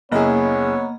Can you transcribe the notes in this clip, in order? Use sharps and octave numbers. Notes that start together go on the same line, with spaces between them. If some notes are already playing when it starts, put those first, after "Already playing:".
F#1 A#3 B3 E4 G#4 C#5 D#5 A#5